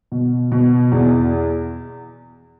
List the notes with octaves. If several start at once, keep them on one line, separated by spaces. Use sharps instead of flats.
B2
B2
E2